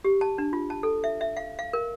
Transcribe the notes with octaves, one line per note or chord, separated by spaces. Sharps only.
G4
A5
D4
F4
A5
A4
E5
E5
F5
F5
A#4